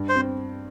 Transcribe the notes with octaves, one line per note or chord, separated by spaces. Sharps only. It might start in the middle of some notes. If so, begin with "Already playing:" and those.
Already playing: G2
C5
C4